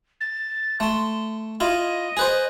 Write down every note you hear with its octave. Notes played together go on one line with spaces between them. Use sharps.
A6
A3 A5 C6
E4 F4 D#5
G#4 B4 C5